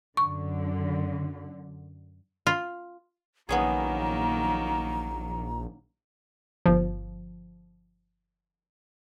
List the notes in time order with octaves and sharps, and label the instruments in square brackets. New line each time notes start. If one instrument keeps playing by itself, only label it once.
[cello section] F#2 D3 [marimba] C#6
[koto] F4
[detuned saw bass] A#1 [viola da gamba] D#3 F#3 A#3 [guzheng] B3 C#4 G#4 [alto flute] A#5
[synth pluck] G1 F3